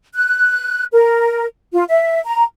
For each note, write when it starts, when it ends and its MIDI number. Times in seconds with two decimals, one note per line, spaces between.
0.14 0.84 90
0.92 1.44 70
1.73 1.83 65
1.89 2.20 76
2.25 2.43 82